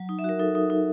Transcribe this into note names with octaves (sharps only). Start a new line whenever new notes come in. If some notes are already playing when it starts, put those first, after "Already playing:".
Already playing: F#3
D#4
E5
F#4 A#4
D#4 A4
D#4
D#4